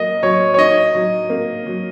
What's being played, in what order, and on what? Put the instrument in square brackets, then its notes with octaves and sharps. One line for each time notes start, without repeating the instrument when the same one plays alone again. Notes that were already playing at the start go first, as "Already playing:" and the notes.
Already playing: [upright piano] F#3 A#3 [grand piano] D#5
[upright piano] F#3 [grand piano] C#5
[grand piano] C#5
[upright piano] D#4 [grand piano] D#5
[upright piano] F#3
A#3
F#3